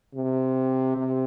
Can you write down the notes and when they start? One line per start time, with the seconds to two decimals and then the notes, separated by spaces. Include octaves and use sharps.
0.14 C3
0.96 C3